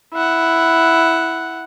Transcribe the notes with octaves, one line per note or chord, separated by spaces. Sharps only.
E4 F#5